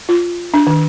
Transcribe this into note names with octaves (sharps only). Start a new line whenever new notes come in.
F4
D4
D#3